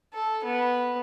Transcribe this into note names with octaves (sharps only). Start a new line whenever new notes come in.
A4
B3